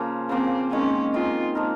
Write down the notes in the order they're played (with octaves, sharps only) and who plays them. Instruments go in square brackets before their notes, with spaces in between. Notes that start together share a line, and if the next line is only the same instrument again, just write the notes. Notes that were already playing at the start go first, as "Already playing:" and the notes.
Already playing: [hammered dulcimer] C#3 F3 A#3
[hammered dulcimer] C#3 F3 A#3 [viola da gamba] C4
[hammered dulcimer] D#3 G#3 C4 [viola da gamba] C#4
[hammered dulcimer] D#3 G#3 C4 [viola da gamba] F4
[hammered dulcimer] F3 A#3 D#4 A#4